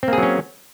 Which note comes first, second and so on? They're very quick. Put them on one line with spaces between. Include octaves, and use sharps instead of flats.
C4 A#3 G#4 F#3 C#4